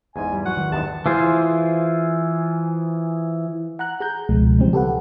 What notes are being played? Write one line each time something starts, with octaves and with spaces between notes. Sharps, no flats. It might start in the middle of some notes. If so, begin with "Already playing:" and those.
E2 G#2 G#5
G3
F#3 F#4 F#5
D#3 E3
E2 G2 G#3 A5
E3 F4 G#4 C5
F#5 A#5 F#6
G#4 A#5 G6
C#2 B2 F3 G#3
C#3 E3 F3 G3 G#3 C4
G4 A4 B4 F#5